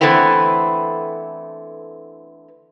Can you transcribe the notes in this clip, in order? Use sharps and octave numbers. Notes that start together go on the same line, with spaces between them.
D3 E3 A3 B3 C4 E4